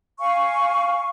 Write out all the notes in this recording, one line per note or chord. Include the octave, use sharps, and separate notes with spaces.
F5 G#5 C#6